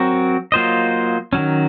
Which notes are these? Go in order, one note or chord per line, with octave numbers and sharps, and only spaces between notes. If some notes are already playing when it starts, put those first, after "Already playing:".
Already playing: F#3 C4 F#4 A#4
F#3 A#3 F4 C5 D#5
D#3 F#3 C#4